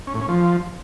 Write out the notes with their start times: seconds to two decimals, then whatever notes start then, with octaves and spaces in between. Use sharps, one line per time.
0.07 C#4
0.14 A2
0.21 C#4
0.29 F3